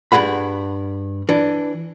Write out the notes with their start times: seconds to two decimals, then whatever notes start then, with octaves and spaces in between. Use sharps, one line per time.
0.12 G2 C#3 G#4 F#5 B5
1.29 E3 D4